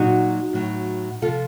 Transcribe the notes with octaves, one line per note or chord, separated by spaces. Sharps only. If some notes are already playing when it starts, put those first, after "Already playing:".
Already playing: A#2 F#3 D#4 F#4
A2 F#3
C3 F3 F4 A4